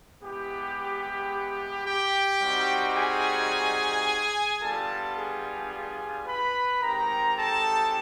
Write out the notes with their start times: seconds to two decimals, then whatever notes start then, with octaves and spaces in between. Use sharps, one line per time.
0.22 G#3 B3 E4 G4
1.87 G4 G5
2.42 G3 C4 D#4 F#4
2.96 G#4 G#5
4.62 G3 B3 D4 F4 A4 A5
5.16 G#4 G#5
5.72 G#4 G#5
6.26 B4 B5
6.81 G#3 C4 D#4 G4 A#4 A#5
7.37 A4 A5